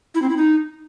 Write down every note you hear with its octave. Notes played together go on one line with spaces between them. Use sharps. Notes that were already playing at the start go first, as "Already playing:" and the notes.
E4
C4
E4
D#4